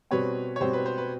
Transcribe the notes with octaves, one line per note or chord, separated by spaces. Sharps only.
B2 G3 C4 B4 C#5
C#5
B2 G3 C4 C5
B4
C5
B4